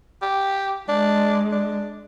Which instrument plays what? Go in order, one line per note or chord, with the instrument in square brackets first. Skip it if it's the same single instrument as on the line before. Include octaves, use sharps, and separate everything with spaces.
[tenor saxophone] G4
[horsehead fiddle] G#3 [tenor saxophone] D4
[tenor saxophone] D4